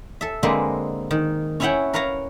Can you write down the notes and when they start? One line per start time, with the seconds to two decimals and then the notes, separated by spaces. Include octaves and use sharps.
0.21 A4 E5
0.43 D3 G#3 A#3 C4 B4
1.11 D#3
1.60 C#4 E4 C#5 E5 F#5 G5
1.93 A#4 B4 C#5 F5 A#5